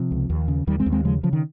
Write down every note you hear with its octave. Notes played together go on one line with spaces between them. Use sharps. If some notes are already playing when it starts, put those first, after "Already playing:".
Already playing: C3 F3
C#2
D#2
C#3
D#2 D#3 G3
G#3 C4
D#2
G#3 C4
C#3 F3 G#3
C#3 F3
D#3